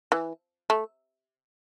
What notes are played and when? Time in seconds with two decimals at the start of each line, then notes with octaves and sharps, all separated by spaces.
0.12 E3
0.70 A3